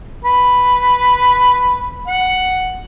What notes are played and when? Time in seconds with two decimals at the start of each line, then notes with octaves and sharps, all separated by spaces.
0.25 B4
2.07 F#5